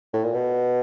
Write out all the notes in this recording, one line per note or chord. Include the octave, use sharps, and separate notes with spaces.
A2
A#2
B2